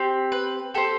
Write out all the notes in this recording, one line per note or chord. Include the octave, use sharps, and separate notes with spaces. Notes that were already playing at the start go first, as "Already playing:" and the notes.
Already playing: C4 G4
B4
C4 G4 A4